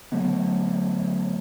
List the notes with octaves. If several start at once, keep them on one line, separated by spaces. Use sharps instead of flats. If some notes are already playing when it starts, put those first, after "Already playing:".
D3 F#3 A3 B3